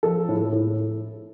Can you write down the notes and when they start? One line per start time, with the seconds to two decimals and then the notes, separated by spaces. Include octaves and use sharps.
0.03 F3 A4
0.29 A2
0.53 A2